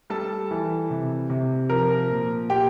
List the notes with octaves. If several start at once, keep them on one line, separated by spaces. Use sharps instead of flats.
G3 A4 A5
E3
C3
C3
F3 A#4 A#5
A#2
A#2 G4 G5